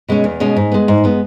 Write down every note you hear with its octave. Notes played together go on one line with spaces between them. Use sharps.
B2 G#3 C#4
E2
B2 G#3 C#4
G#2
G#3 B3
G#2
G#3 B3